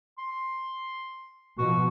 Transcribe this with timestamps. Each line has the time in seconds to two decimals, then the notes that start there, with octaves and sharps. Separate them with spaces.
0.18 C6
1.58 B2 F3 F#4